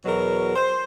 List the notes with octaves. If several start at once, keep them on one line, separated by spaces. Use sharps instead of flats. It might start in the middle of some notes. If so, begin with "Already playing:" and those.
E2 B2 F#3 A#4
C5